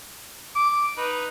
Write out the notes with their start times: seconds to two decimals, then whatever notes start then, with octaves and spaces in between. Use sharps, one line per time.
0.56 D6
0.97 D#4 B4